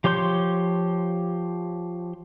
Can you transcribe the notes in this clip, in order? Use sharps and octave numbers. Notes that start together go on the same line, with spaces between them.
F3 G4 C#5 C6 G6